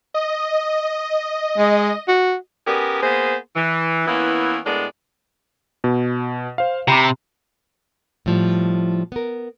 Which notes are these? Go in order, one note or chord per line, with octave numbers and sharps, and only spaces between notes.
D#5
G#3
F#4
B3 C#4 G4 G#4 A#4
A#3 B3 G#4 C5
E3
E3 A#3 B3 C#4 E4
A2 G#3 B3 D4 A#4 D5
B2
C5 F5
C3 A#5 B5 D6
A2 F3 G3
B3 A#4